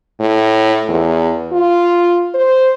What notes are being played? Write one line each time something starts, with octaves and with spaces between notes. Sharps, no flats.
A2
E2
F4
C5